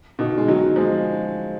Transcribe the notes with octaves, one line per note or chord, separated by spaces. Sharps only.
B2 D#3
G#3
D#3 F#3
F3 G#3